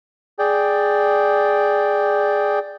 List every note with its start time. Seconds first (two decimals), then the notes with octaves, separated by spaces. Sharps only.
0.39 G#4 D5 G5